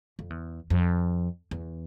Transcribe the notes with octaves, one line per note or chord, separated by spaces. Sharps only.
F2
E2
F2
E2